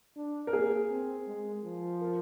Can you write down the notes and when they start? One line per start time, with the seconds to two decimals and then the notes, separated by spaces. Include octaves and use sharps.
0.16 D4
0.47 A#4
0.53 A#3 G#4
0.91 C4
1.27 G#3
1.64 F3
2.01 A#4